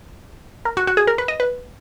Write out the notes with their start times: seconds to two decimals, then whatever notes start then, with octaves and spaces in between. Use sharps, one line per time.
0.65 A#4
0.77 F#4
0.87 F#4
0.97 G#4
1.07 A#4
1.18 B4
1.28 D#5
1.40 B4